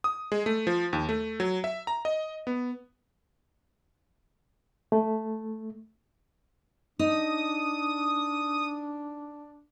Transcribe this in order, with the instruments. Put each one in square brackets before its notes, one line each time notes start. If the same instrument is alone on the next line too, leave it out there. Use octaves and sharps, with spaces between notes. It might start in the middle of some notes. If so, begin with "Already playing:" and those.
[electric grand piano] D#6
G#3
A3
F3
D#2
A3
F#3
E5
A#5
D#5
B3
[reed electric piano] A3
[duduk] D4 [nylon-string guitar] D#4 [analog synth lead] D#6